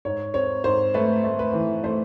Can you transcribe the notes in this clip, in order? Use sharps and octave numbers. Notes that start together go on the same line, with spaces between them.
G#2 C#5
C4 C#5
G#2 C5
A3 B4
A3
B4
E3
A3 C5